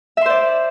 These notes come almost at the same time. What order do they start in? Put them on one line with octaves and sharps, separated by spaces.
E5 C6 C5 D5